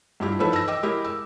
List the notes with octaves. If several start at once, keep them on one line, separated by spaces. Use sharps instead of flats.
G2 E4 F4 G4
E3 F3 D#4 A4 B4
E6 A#6
D#5 G5 D6 E6
G#3 E4 G4 A#4
E6